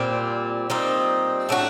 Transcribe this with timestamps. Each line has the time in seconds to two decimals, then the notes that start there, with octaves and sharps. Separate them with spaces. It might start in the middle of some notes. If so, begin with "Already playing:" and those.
Already playing: A#2 G3 C4
0.70 A#2 G3 C4 D#4
1.49 A2 A3 D4 F#4